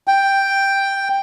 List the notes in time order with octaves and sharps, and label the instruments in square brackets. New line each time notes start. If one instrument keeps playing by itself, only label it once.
[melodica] G5